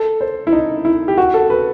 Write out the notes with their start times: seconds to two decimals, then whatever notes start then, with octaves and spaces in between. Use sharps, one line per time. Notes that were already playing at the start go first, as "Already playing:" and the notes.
Already playing: A4
0.21 C5
0.47 E4
0.53 D#4
0.85 E4
1.08 G4
1.18 F#4
1.34 A4
1.50 B4